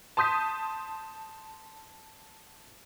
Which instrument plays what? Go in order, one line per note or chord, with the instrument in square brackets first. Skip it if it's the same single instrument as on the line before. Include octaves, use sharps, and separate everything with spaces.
[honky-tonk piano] A5 C6 D#6 G6 B6